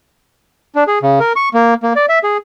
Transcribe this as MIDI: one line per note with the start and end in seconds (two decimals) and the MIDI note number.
0.76 0.84 62
0.87 0.99 68
1.03 1.19 49
1.20 1.33 70
1.36 1.49 85
1.54 1.74 58
1.83 1.93 58
1.96 2.06 74
2.09 2.19 76
2.24 2.37 68